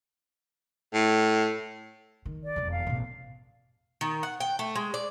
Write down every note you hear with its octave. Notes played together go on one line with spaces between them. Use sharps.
A2
D#3
D5
E1 F2
F5
A1 B2
D#3
F#5
G5
A3
G#3
D5